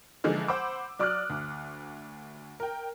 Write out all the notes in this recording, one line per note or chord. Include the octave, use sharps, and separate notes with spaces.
D3 E3 F3 G#3 A#3
C5 F#5 B5 D6 E6
F#3 D5 D6 D#6 F6 F#6
D2
A#4 G5